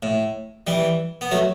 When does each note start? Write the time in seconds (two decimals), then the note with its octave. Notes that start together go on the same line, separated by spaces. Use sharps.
0.03 A2
0.67 E3 G3
1.21 B3
1.31 F#3 A3